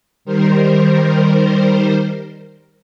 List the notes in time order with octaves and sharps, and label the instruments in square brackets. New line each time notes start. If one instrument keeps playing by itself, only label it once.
[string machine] D#3 G3 A#4 C5